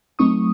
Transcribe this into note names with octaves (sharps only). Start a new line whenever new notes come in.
F#3 A3 C4 D#4 C#6 D#6